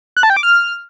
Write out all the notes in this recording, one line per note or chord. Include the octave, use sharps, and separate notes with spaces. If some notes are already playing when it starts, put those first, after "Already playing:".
F#6
A5
G5
D6
F6